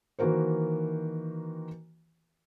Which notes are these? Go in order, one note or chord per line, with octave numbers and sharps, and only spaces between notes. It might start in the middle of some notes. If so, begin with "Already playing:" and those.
D#3 E3 A#3 F#4 A#4 C5